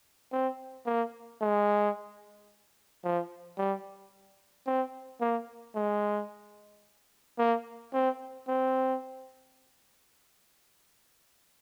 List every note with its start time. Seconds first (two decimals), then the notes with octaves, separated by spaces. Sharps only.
0.32 C4
0.86 A#3
1.41 G#3
3.04 F3
3.58 G3
4.66 C4
5.21 A#3
5.75 G#3
7.38 A#3
7.93 C4
8.48 C4